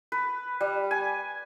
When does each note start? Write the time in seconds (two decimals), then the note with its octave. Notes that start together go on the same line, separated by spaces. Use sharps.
0.12 B4
0.61 G3
0.91 G#5